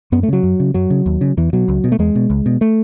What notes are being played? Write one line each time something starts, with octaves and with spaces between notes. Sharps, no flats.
F#2 B3
A3
C#3 F#3
F#2
C#3
F#2 F#3
C#3
D#2
C#3
E2 E3
B2 F#3
C#2
B2
A3
E2 G#3
B2
C#2
B2
A3